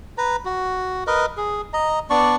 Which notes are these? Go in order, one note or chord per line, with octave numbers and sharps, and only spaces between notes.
B4 A#5
F#4
A#4 B4 D#5
G#4
D#5 A#5
B3 D4 D5 C#6